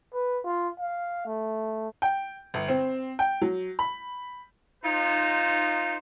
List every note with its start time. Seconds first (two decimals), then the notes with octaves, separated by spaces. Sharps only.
0.14 B4
0.45 F4
0.80 F5
1.26 A3
2.02 G5
2.54 G1
2.68 C4
3.19 G5
3.42 F#3
3.79 B5
4.84 D#4 F4 C5